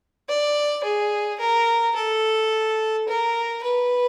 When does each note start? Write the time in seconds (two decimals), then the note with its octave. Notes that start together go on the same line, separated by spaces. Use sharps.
0.29 D5
0.84 G#4
1.40 A#4
1.96 A4
3.08 A#4
3.63 B4